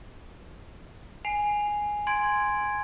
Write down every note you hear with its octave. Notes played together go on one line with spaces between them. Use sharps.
G#5 C7 F7
G#5 C6 G#6 D7